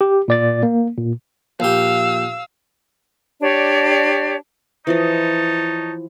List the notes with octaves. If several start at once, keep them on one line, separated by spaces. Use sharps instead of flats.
G4
A#2 D5 A6
A#3
A#2
A#1 G4 F5 E6
D4 G4 C#5 D5
E3 F3 D#4 C#5 D#5 A5